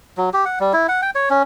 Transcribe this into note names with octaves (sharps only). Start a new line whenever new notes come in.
F#3
G4
F#5
G3
E4
F#5
G5
C#5
C#4